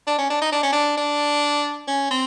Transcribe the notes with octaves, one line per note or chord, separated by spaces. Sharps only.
D4
C#4
D4
D#4
D4
C#4
D4
D4
C#4
C4